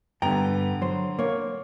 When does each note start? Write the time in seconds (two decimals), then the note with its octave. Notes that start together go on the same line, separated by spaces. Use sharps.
0.22 G2 D3 B3 G5 A#5
0.81 F#3 C5
1.19 A#3 C#5